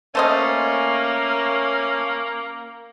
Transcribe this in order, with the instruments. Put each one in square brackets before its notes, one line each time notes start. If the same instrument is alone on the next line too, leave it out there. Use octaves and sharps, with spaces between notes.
[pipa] A3 C5 D#5 [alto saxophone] A#3 [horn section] C#4